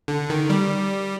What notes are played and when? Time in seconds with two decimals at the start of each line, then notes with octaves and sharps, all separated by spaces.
0.08 D3
0.30 D#3
0.50 G3